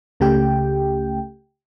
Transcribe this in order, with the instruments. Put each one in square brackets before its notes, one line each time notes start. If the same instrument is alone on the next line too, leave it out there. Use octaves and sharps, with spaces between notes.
[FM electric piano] C#2 C#3 A3 G4 G5